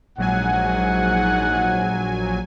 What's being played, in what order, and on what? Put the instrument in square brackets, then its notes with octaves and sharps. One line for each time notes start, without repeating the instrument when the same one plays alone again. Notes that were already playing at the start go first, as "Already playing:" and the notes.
[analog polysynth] A#1 F#3 G#5 [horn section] G#2 F#5